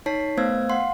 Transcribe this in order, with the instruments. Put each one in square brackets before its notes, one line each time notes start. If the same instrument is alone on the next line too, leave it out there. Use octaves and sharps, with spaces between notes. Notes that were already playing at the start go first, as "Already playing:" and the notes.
[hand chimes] D#4 C#5 A5 B6 C7
A3 B3 C5 F5 E6 G#6
F5 F#5 C6